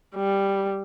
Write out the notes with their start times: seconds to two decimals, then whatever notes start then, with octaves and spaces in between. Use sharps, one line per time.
0.15 G3